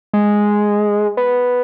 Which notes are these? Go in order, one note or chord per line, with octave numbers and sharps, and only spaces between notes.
G#3
B3